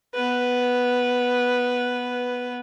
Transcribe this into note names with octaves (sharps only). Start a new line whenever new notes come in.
B3 B4